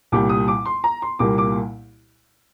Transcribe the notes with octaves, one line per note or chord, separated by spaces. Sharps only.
C2 A#2 G3 D6
D#6
D6
C6
A#5
C6
C2 A#2 G3 A#3 D6
D6